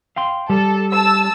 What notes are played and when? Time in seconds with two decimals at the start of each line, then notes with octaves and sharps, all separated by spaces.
0.16 F5 G5 C6
0.50 G3 A4
0.92 A5 E6